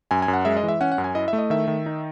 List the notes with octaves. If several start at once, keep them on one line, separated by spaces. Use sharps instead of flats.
F#2 G#5
G#5
F#2
F#5
G#3 E5
D#5
E3
E5
C#4 F#5
F#5
F#2
G#5
E4 D#5
E5
A3
D#5
D#3 E5
D#3
D#4